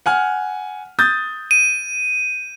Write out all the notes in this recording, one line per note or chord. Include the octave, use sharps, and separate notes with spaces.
F#5 G#5 F6
D#6 G6 A6
D#7